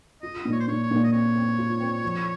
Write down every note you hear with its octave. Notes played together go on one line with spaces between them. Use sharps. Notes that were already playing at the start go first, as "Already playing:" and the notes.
F4 D#5
A#2
C#5
C5
A#2 C#5
C#5
A#2
D#5
C4 C#5
C4
F4
C4
F3